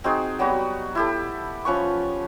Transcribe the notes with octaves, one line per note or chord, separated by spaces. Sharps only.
C4 D#4 F#4 G#4
F#3 G3 B3 F#4
E4 G4 A4
F3 C#4 B4 C#6